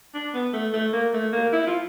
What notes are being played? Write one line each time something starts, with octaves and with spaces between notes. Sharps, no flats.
D4
B3
A3
A3
A#3
A3
A#3
E4
F4